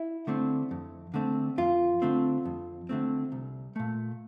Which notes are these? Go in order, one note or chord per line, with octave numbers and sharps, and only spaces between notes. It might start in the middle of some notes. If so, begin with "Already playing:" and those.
Already playing: E4
D3 A3 C4
F2
D3 A3 C4
F2 F4
D3 A3 C4
F2
D3 A3 C4
C2
A#2 A3